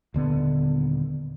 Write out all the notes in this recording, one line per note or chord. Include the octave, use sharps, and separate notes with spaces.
D#1 D3 B3